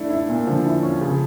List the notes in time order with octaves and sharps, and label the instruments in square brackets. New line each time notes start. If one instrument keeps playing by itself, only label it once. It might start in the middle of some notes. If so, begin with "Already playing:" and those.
Already playing: [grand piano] A3 [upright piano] D4 E4
[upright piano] E4
A#2
[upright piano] D3 [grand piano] F3
[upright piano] E4
C#4
C#3